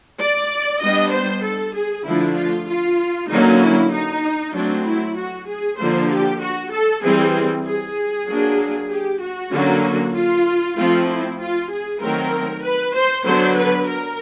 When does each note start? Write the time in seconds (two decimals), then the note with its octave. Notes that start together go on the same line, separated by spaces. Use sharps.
0.19 D5
0.81 G3 B3 D4 D#5
1.12 C5
1.43 A4
1.74 G#4
2.05 D3 F3 A3 D4 E4
2.36 F4
2.68 F4
3.29 D3 F#3 A#3 C#4 D#4
3.60 E4
3.91 D#4
4.54 F#3 A3 C4 D4
4.85 E4
5.17 F#4
5.47 G#4
5.78 D3 F3 A#3 C5
6.09 G4
6.41 F#4
6.72 A4
7.03 E3 G3 C4 G#4
7.66 G#4
8.28 F#3 A#3 D4
8.89 G4
9.20 F#4
9.52 D3 F#3 A#3 C#4
10.14 F4
10.76 F3 A3 C4 F4
11.08 E4
11.39 F4
11.70 G#4
12.00 D#3 F#3 A3 C4 A#4
12.63 B4
12.94 C5
13.24 D3 F#3 B3 D4 C5
13.56 B4
13.87 A#4